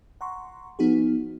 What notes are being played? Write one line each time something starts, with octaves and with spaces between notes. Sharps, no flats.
F#5 A#5 C6 C#6
F3 B3 D#4 F#4 G#4